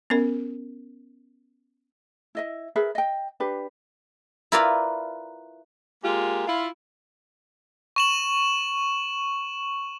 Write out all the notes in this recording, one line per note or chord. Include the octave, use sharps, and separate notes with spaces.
B3 C#4 A#4
E4 D#5 E5
G#4 A#4 B4 E5
D#5 G5
D4 G4 B4
E4 F4 A#4 B4 D5 F5
G#3 A#3 F4 G4
E4 F4
C#6 E7 F#7